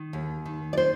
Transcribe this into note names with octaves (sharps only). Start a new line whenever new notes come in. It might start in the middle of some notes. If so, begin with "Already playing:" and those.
Already playing: D#3
D#2
D#3
D5
C5